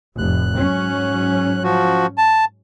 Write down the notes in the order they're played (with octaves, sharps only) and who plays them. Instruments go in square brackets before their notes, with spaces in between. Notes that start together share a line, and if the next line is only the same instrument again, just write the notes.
[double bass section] F1 A2 [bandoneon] F#6
[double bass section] G#2 F#3 C#4
[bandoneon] F3 F#4
A5